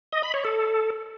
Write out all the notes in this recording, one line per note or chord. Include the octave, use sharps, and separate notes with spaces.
D#5
B5
C#5
A4